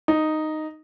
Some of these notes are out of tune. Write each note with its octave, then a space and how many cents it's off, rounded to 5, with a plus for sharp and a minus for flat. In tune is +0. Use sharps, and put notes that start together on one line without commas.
D#4 -5